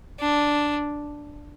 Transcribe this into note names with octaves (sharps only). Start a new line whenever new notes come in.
D4